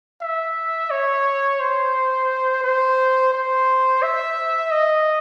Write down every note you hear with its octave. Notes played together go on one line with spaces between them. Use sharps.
E5
C#5
C5
C5
C5
E5
D#5